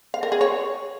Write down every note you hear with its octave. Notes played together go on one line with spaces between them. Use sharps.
F5
A#4
G#4
C#5